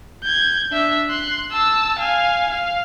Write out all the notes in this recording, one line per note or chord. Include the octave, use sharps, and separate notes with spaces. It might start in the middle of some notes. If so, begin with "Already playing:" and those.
G6 G#6
D4 E5
C6 F#6
A5 E6
F5 G#5
F5